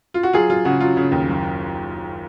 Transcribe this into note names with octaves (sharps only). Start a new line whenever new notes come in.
F4
F#4
F#3 F4 G#4
F#3 F4
C#3 F#4
F#3 F4
C#3
D#2
F#1